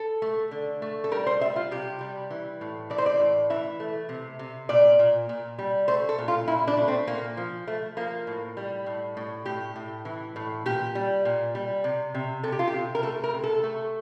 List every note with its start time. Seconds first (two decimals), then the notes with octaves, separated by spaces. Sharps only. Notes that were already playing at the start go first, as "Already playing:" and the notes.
Already playing: A4
0.22 A3
0.51 D3
0.82 A3
1.04 A4
1.11 G3 A#4
1.27 C5
1.41 G3 E5
1.56 F4
1.71 C3 G4
2.01 G3
2.30 E3
2.61 A2
2.90 E3 D5
2.98 C5
3.06 D5
3.20 A2
3.50 E3 E5
3.80 A3
4.09 C3
4.39 C3
4.69 A#2 D5
4.99 A#2
5.29 A#2
5.59 G3
5.88 A3 C5
6.09 A4
6.18 A#2
6.28 F4
6.48 A#2 E4
6.68 D4
6.77 A3
6.88 C4
7.07 A#2 A#3
7.37 F3
7.67 F3 A3
7.97 F3 A#3
8.27 A2
8.57 G3
8.86 A2
9.17 A2
9.46 A2 G4
9.76 A2
10.05 E3
10.36 A2
10.66 A#2 G4
10.95 G3
11.25 A#2
11.55 G3
11.84 C3
12.15 C3
12.43 C3 A4
12.52 G4
12.59 F4
12.68 G4
12.73 C3
12.95 A#4
13.03 A3 A4
13.24 A#4
13.34 C3
13.44 A4
13.63 A3